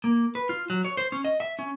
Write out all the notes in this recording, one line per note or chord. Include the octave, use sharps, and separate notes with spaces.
A#3
B4
F4
F#3
C#5
C5
C#4
D#5
E5
C#4